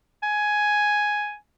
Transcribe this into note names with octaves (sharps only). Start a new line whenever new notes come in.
G#5